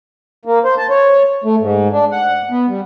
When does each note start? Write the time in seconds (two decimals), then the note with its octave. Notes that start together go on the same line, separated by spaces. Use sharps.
0.45 A#3
0.65 C5
0.78 A5
0.90 C#5
1.44 A3
1.60 G#2
1.92 D4
2.12 F#5
2.50 B3
2.68 G3